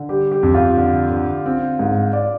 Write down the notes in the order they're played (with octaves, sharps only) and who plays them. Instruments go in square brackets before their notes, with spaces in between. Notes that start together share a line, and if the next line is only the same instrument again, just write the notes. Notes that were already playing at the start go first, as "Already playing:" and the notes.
Already playing: [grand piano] D3
[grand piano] G3 [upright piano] G4
[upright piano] G4
[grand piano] F2
[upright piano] F4
[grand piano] D3
D3
C4
G#2
[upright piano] D5